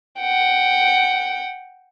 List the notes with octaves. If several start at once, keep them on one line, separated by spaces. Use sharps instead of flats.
F#5 G5